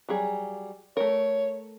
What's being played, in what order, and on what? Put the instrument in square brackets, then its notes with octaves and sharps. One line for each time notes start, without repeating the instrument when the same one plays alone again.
[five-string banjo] F#3 G3 G#4
[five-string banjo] A3 A#4 [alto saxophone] C#5